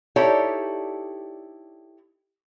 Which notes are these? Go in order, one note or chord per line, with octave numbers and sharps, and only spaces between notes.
D#4 E4 G4 A4 C#5 D5